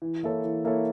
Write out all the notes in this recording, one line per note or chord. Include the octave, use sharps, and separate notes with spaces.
E3
A#3 E4 A4 C#5
E3
A#3 E4 A4 C#5